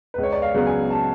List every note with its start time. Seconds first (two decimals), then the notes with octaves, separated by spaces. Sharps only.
0.14 C#2 B4
0.23 C#5
0.33 D5
0.42 F5
0.54 C#3 F#3 B3
0.67 G#5
0.90 A5